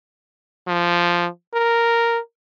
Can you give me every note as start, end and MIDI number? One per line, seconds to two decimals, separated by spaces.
0.67 1.28 53
1.54 2.19 70